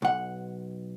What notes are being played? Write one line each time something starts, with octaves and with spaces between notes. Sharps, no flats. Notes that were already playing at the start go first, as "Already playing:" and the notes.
B1 F#5